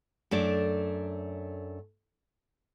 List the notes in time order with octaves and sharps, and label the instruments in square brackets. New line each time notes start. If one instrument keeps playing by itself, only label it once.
[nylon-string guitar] F#2 A3 D4 D5